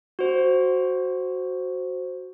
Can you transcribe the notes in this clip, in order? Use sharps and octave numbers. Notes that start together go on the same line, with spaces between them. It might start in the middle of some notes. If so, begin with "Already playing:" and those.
F#4 C5